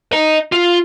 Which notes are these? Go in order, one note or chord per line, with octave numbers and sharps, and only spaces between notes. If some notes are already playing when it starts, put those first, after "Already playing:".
D#5 A#5
F4